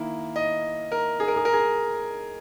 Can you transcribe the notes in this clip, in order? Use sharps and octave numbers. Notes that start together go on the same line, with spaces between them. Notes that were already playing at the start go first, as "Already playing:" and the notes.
Already playing: D#3 A#3 E4
D#5
A#4
G#4
A#4
G#4
A#4
G#4